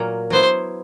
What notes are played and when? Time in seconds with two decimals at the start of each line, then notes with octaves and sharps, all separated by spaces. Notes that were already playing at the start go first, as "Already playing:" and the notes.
Already playing: A#2 F#3 A#3
0.30 F#3 B3 E4 C5